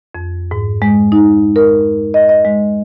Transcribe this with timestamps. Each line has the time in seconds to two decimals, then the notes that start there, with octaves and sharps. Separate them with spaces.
0.15 F2
0.51 G#2
0.82 G#3
1.12 D#4
1.56 A#4
2.14 D#5
2.29 D#5
2.45 G#3